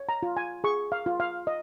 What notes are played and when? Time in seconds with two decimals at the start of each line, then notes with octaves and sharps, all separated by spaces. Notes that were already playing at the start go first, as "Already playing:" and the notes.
Already playing: C#5
0.09 A#5
0.23 F4
0.37 G#5
0.64 G#4 C#6
0.92 F5
1.06 F4
1.20 F5
1.47 D#5